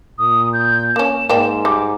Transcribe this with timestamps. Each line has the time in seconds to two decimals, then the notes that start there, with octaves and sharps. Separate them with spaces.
0.18 A#2 D#6
0.53 G6
0.96 A#3 C#4 E7
1.29 G#2 A#3 D5 G5
1.65 G3 D6